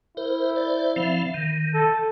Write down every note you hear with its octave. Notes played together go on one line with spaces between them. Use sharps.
E4 A#4 C5
C5 D5
F3 C4 F5
D#3
A4